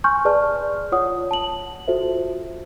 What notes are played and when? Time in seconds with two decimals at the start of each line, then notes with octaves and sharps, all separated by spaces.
0.04 G#5 C6 C#6 F6 G6
0.25 G#4 B4 D5 A5 F6
0.92 F4 C#5 F#5 D#6
1.31 A5 F#7
1.88 F4 F#4 A4 C5 E5